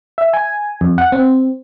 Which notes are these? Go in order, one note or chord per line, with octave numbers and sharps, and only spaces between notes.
E5
G#5
F2
F#5
C4